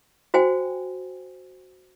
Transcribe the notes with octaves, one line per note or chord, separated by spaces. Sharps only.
F#4 C5 G5 G#5